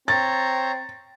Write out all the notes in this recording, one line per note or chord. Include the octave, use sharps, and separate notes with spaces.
C4 C#5 A#5 A6